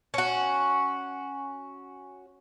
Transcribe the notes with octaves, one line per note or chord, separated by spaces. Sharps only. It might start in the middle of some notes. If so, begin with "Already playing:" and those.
C#4 F#4